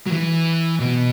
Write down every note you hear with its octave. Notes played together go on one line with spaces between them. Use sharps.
F#3
E3
B2